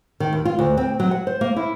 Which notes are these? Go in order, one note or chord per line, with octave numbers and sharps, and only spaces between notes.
D#3
D#2
F4
D2
C4
F#3
F#5
C5
A#3
E4